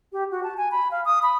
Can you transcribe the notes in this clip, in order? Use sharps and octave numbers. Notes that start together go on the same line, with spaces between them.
G4
F#4
A5
G#5
B5
F5
D#6
B5